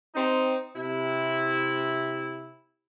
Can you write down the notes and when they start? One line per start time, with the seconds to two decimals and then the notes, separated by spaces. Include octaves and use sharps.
0.15 C4 D#4
0.76 C3 E4